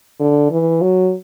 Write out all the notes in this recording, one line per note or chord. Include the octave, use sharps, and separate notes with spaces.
D3
E3
F#3